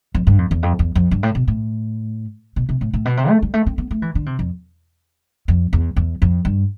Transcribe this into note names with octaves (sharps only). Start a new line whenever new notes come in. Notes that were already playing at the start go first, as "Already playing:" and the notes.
F2
G2
F2
E2
F2
E2
F2
G2
A2
B2
A2
B2
C3
A2
A2
B2
C3
A3
G3
A3
C4
B3
A3
E3
D3
C3
F2
F2
E2
E2
F2
G2